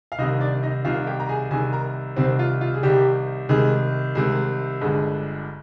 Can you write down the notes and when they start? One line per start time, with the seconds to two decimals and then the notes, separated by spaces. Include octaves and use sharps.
0.12 F5
0.18 C2 C3 D#3 D#4 D#5
0.41 D4 D5
0.63 D#4 D#5
0.84 C2 C3 D#3 F4 F5
1.07 G4 G5
1.20 A#5
1.29 G#4 G#5
1.50 C2 C3 D#3 G#4 G#5
1.73 A#4 A#5
2.16 C2 C3 D#3 C4 C5
2.39 F4
2.61 F4
2.74 G#4
2.83 C2 C3 D#3 G3 G4
3.49 C2 C3 D#3 G#3 G#4
4.15 C2 C3 D#3 G#3 G#4
4.81 G1 G2 D3 G#3 G#4